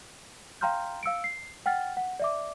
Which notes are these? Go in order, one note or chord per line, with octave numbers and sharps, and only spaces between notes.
F5 G5 A#5 C6 F6 G6
F5 E6 C#7 D7
C7
F#5 G5 F6 A6
F#5
D5 E5 D6